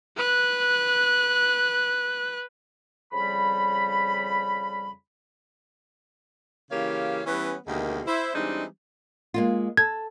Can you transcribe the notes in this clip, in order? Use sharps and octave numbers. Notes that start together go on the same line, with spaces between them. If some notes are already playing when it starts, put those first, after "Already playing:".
B4 F#6
F2 C#3 G3 B5
C#3 E3 A#3 G4 C#5 F5
E3 G3 B3 C#4
D2 B2 D#3 G#3 A#3 G4
E4 C5
E3 G3 G#3 C4 D4 D#4
G#3 A#3 F4
A4 G#6